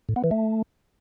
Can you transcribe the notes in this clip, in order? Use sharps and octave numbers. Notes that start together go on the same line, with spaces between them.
A2
B3
E3
A3